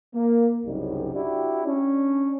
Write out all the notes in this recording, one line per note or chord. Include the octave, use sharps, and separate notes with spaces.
A#3
C2 F#2 C#3 G3 D#4
D4 E4 F#4 G4
C#4 D4